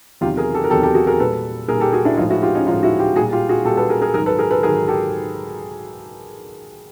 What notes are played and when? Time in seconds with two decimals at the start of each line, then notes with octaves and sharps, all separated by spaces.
0.21 E2 C3 D#3 F#3 F4 G4
0.37 G#4 A#4
0.54 G4 A4
0.64 A#4
0.70 E2 C3 D#3 F#3 G4 A4
0.83 G4 A4
0.94 F#4 G#4
1.07 G#4 A#4
1.20 A#2 G3 A4 B4
1.68 A#2 G3 G#4 A#4
1.80 G4 A4
1.93 F#4 G#4
2.05 D4 E4
2.17 A2 F3 G#3 D#4 F4
2.30 E4 F#4
2.42 F4 G4
2.55 C#4 D#4
2.67 A2 F3 G#3 D#4 F4
2.83 E4 F#4
2.99 F4 G4
3.16 G3 F#4 G#4
3.19 A#2
3.32 F4 G4
3.49 F#4 G#4
3.65 A#2 G4 A4
3.69 G3
3.77 A4 B4
3.89 G#4 A#4
4.02 G#4 A#4
4.14 G#2 D#3 F#3 G#4 A#4
4.26 A4 B4
4.39 G#4 A#4
4.51 A4 B4
4.63 G#2 D#3 F#3 G#4 A#4
4.88 G4 A4